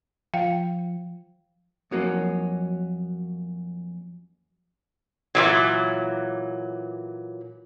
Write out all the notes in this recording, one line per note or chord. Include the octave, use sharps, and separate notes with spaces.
F3 F5 G5
F2 F#3 A#3 C#4
A#2 E3 F#3